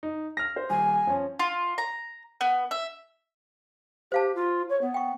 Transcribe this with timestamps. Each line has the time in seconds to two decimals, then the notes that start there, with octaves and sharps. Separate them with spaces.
0.03 D#4
0.37 F6 A#6
0.56 C5
0.70 D#1 G#5
1.07 F3 C#4
1.39 F4
1.78 A#5
2.41 B3
2.71 E5
4.12 G4 C5 F5 A5
4.35 F4
4.70 C#5
4.81 B3
4.94 G5 C#6